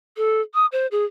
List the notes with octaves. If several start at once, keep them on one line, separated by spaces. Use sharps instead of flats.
A4
D#6
C5
G#4